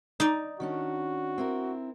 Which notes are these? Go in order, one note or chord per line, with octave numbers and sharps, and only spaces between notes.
D#4 D5
D#3 C#4 D4 F#4
C4 E4 A#4